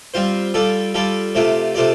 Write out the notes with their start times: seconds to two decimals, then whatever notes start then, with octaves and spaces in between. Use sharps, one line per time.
0.14 G3 C4 F4 C5
0.54 G3 F4 A4 D5
0.94 G3 F4 A4 D5
1.35 C3 A3 F4 D5
1.75 C3 A3 F4 D5